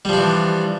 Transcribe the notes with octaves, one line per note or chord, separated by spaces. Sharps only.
E3 F3 G3 D4